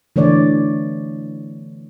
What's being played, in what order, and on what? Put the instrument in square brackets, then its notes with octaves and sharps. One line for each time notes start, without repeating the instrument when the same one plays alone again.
[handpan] D3 E3 A3 C#5 D5